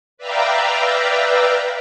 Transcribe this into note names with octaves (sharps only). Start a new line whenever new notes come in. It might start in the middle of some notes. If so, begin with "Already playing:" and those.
B4 D5 E5 F5 G5 A#5